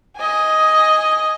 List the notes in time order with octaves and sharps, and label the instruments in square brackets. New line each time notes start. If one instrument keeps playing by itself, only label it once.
[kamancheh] D#5 G#5